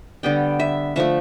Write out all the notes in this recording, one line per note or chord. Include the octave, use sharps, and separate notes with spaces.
D3 G3 B3 G5
E5
D3 F3 A3 E5